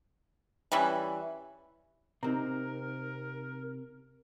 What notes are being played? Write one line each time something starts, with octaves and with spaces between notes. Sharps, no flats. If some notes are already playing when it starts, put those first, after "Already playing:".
E3 G3 C#4 B4
C3 C4 D#4 A#4 A#5